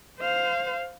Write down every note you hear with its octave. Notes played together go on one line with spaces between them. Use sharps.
C5 F5